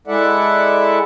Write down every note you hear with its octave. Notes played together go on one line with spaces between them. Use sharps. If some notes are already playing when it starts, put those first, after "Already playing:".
G#3 E4 A4 D5 E5 F#5